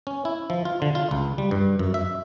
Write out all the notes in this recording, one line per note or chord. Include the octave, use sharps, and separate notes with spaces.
C#4
E4
F3
F4
D3
F4
C#2
G3
G2
F#2
E5